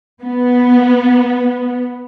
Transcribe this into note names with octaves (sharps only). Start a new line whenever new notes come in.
B3